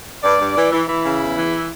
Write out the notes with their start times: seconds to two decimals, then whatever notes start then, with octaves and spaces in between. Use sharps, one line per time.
0.24 G2 D5
0.40 G2
0.56 E3
0.72 E3
0.88 E3 E4
1.04 C#3
1.20 E2
1.37 E3